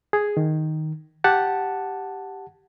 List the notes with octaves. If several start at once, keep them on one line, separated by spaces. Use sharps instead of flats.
G#4
D#3
G4 F#5 A5